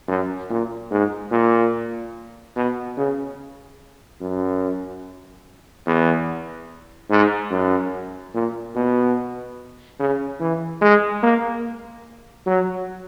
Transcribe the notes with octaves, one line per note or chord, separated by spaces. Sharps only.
F#2
A#2
G#2
A#2
B2
C#3
F#2
E2
G#2
F#2
A#2
B2
C#3
E3
G#3
A#3
F#3